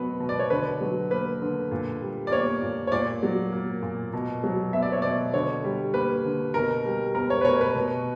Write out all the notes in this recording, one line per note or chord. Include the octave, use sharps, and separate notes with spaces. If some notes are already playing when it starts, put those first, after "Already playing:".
Already playing: B2 F#3 B3 B4
B2
D5
C#5
D3 B4
F#3
A#3 B4
D3
A#2
G3
D5
A#3 C#5
A#2
C#5
A#2 D5
F#3
A#3
A#2
B2
F#3
B3 E5
D5
C#5
B2 D5
D3 C#5
G3
A#3 B4
D3
B2 A#4
G3
B3 A#4
C#5
B4
B2 C#5
B4
B2